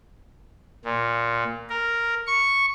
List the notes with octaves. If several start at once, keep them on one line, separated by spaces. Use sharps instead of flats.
A#2
A#4
C#6